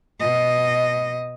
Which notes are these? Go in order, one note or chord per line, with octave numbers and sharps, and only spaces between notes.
B2 D#5